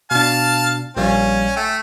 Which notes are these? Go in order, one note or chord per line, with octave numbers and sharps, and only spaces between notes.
B2 D4 F5 A5
A#1 G3 C#4 F5
A3 G5